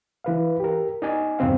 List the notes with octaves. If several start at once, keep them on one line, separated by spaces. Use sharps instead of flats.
E3 B4 F5
G4 A#4
D#4 D5 G#5
E2 G2 C3 C4 F5